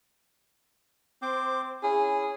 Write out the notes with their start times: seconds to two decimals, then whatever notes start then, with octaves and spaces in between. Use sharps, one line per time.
1.22 C4 C5 D6
1.83 C#4 E4 G#4